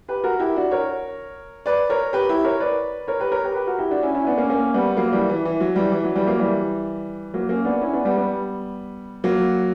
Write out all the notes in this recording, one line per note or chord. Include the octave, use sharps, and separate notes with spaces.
G4 B4
F#4 A#4
E4 G4
D4 F#4
A#4 C#5
B4 D5
A#4 C#5
G4 B4
E4 G4
A#4 C#5
B4 D5
A#4 C#5
G4 B4
A#4 C#5
G4 B4
G4 B4
F#4 A#4
E4 G4
D4 F#4
C#4 E4
C#4 E4
B3 D4
A#3 C#4
A#3 C#4
G3 B3
F#3 A#3
E3 G3
E3
E3
F#3
E3 G3
E3
F#3
E3 G3
F#3 A#3
E3 G3
F#3 A#3
A#3 C#4
B3 D4
C#4 E4
B3 D4
G3 B3
G3 B3
F#3 A#3